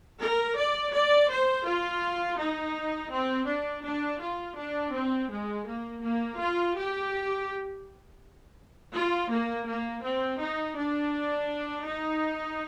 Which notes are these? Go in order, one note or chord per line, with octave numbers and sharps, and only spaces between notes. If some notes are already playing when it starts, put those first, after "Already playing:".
A#4
D5
D5
C5
F4
D#4
C4
D4
D4
F4
D4
C4
G#3
A#3
A#3
F4
G4
F4
A#3
A#3
C4
D#4
D4
D#4